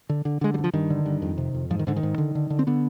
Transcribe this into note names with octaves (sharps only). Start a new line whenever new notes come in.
D3
D3
D3 G#3
G3
G2
F3
G2 D#3
D3
G2
F2
C3
F2
G#2 F3
D#3
G#2 D3
D#3
G#2
D3
D3
D3
C4
D3 B3